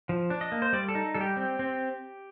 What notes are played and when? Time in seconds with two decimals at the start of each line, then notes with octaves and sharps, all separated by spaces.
0.09 F3
0.30 D4
0.41 D#5
0.52 A#3
0.62 C5
0.73 G3 D5
0.89 A4
0.95 D#4
1.14 G3 A4
1.21 G4
1.37 C4
1.59 C4